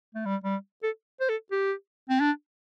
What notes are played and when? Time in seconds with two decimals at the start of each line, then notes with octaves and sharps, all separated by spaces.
0.15 A3
0.26 G3
0.44 G3
0.83 A4
1.21 C5
1.29 A4
1.52 G4
2.10 C4
2.21 D4